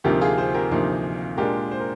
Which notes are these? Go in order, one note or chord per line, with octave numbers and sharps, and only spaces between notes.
D2 C3 F3 A#3 D#4 G4 A#4
F4 G#4
G#4 C5
G4 A#4
D2 C3 F3 A#3 D#4
A#2 G#3 D4 G4 A#4
C5
A#4